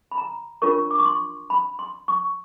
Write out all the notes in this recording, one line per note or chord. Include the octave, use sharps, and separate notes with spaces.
B5
A#5
D4 F4 A#4 C#5 C#6
D6
C#6
C6
B5
C6
C#6